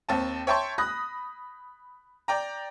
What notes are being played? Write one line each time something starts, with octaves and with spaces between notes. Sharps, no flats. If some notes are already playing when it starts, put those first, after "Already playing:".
D#2 C4 A5
C#5 E5 G5 A5 C6 C#6
B5 D#6 F#6 A#6
D5 G5 A#5